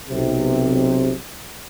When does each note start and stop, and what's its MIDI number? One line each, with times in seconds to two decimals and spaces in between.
0.10 1.14 35
0.10 1.14 48